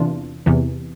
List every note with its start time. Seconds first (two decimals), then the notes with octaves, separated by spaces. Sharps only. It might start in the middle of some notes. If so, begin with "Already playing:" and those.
Already playing: E2 C3 E3 D4 F4
0.46 E2 C3 E3